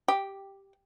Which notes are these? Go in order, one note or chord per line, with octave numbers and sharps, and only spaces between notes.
G4